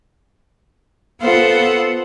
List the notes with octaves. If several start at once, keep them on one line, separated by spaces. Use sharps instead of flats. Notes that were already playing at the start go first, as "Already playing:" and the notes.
B3 F4 A4 C5 F#5